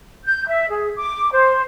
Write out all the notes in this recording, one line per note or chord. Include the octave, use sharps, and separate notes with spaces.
G6
E5
G#4
D6
C5